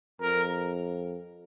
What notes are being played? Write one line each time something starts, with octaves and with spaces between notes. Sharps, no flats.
F2 A#4